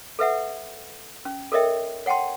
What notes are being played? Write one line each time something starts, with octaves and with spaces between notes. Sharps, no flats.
A4 B4 E5 F#5
C#4
A4 A#4 C#5 D#5 E5 G5
C#5 F#5 G5 A5 C6